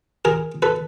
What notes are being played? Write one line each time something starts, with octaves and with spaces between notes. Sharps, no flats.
G#4 A#4
A4 B4